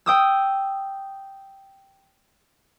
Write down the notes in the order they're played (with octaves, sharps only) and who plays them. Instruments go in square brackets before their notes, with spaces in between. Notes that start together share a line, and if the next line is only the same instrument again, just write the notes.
[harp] G5 D#6 E6